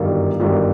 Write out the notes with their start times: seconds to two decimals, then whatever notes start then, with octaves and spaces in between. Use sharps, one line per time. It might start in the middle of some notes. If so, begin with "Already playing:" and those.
Already playing: G1 F#2 D#3 G3 F5
0.40 G1 F#2 D#3 G3